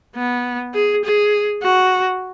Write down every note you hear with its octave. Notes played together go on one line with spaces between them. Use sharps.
B3
G#4
G#4
F#4